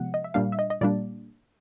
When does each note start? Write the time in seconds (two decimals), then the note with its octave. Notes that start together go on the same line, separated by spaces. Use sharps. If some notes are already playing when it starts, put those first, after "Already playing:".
Already playing: C3 F3 G#3 B3 F#5
0.14 D#5
0.24 E5
0.34 A#2 G3 A#3 D4 F5
0.52 E5
0.59 D#5
0.70 D#5
0.81 A#2 G3 A#3 D4 D5